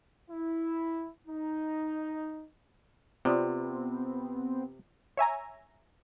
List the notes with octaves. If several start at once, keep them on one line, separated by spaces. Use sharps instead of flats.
E4
D#4
C3 B3 C4 F4 D5 D#6
C#5 E5 G#5 A#5